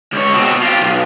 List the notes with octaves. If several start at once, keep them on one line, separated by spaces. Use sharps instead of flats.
C#2 C#5
B2 C4
F4 G4
B1